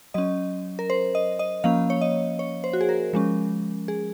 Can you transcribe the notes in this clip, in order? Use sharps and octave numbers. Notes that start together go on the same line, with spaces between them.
F#3 C#4 D#5
A#4
C5
D#5
D#5
F3 A#3 C#4 F5
C#5
D#5
C#5
C5
F#4
G#4
A#4
F3 G#3 C#4
G#4